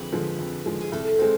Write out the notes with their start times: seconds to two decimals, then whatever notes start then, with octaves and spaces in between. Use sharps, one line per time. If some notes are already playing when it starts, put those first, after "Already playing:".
Already playing: F2 D3 F3 G#3 B4
0.13 D3 F3 G#3
0.39 F2
0.65 D3 F3 G#3
0.81 G#4
0.92 C2 A4
1.19 G#3 C4 A4